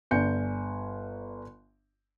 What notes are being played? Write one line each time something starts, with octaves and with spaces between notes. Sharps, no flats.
G1 D4 G#5 G6 C#7